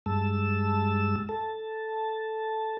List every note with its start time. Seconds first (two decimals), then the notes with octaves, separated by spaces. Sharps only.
0.06 G2 G#3 A5 E6
1.29 A4 A5